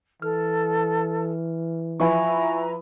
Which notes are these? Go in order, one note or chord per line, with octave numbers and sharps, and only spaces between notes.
E3 A4 F6
F3 E4 B4 E5 G#5 A#5 C#6